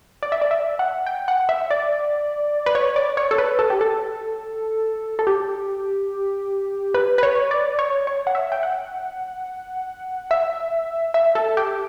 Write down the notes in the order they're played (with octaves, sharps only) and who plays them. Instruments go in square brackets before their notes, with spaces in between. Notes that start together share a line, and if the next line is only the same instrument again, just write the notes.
[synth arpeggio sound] D5
E5
D5
E5
F#5
G5
F#5
E5
D5
B4
C#5
D5
C#5
A4
B4
A4
G4
A4
A4
G4
B4
B4
C#5
D5
C#5
C#5
F#5
E5
G5
F#5
E5
E5
A4
G4